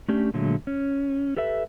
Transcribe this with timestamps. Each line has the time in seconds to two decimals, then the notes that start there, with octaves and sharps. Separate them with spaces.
0.08 A3 C#4 D4 G4
0.34 A#2 D3 F#3 G#3 A3
0.67 C#4
1.37 G4 A4 B4 E5